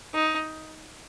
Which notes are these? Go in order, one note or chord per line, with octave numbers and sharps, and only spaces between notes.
D#4